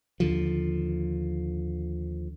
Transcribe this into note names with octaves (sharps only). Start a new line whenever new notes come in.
D#2 D3 F3